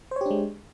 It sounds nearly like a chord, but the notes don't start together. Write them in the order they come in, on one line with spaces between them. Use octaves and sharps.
C5 C#5 G4 D4 G#3